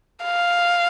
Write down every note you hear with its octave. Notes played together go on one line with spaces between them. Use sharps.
F5